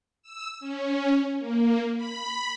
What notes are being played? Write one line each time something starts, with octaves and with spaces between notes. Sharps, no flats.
E6
C#4
A#3
B5